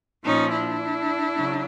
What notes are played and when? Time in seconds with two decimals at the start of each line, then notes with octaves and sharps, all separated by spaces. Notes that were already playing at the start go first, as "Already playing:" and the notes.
0.23 A#2 F3 C#4 D#4
0.51 D4 E4
1.36 C#3 F#3